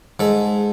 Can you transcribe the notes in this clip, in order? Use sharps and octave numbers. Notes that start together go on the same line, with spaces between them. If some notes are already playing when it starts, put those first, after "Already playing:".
G#2 A4